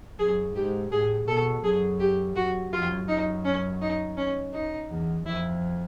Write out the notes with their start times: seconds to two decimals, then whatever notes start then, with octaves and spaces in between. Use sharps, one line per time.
0.19 F#2 G#4
0.55 G#2 G4
0.91 A2 G#4
1.28 B2 A4
1.64 F#2 G#4
2.00 G4
2.36 F#2 F#4
2.72 F#2 F4
3.08 F#2 D#4
3.45 C#4
3.81 D#4
4.17 C#4
4.53 D#4
4.90 E2
5.26 F2 E4